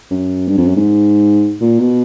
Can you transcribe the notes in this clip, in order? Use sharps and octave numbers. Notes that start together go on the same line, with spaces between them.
F#2
G2
F2
F#2
G#2
A#2
B2